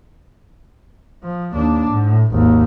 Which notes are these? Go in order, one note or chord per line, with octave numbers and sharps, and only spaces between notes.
F3
D#2 D4
A2
G#1 D#2